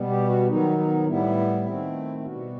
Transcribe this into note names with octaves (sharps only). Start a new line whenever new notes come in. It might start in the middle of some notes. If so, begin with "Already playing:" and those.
Already playing: B2 G3 B3
G4
F#4
D#3 F#3 B3 D#4
D#4
A2 G3 B3 E4
D#3 A3 C4
E4
B2 G3 B3 F#4